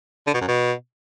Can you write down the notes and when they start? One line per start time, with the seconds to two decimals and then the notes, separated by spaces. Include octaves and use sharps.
0.27 D3
0.34 B2
0.41 F#2
0.48 B2